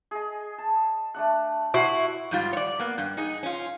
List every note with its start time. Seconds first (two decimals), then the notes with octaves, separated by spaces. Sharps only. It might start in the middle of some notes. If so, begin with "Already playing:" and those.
0.11 G#4 D#5
0.58 A5
1.14 A3 D4 F#5
1.74 E4 F#4 C6 C#6
2.31 G#2 G3 F4
2.53 C#5 D5
2.79 A#3 B3
2.98 G2
3.17 D#4 G#4
3.43 C#4 F4